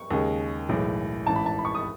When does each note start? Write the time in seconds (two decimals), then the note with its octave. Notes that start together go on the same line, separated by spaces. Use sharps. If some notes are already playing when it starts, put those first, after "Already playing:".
Already playing: C#6
0.11 D#2 C#3 G#3
0.69 B1 A2 E3 G#3
1.26 A1 G#2 E3 A5
1.36 B5
1.46 A5
1.59 B5
1.65 C#6
1.75 D#6